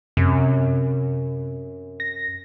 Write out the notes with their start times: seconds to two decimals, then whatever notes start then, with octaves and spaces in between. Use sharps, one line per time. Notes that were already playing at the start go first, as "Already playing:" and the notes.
0.17 F#2 C3
2.00 A#6